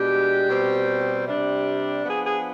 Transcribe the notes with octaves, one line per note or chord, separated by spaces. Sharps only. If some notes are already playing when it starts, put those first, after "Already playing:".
Already playing: B2 G#3 D4 G4
B2 G3 C4
C3 G3 D4
F3 B3 D4 G#4
G#4